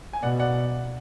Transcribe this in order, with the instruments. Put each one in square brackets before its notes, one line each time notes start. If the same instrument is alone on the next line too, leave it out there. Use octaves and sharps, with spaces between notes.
[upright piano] G#5
[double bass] B2 [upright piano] D5 F#5
[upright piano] D5 F#5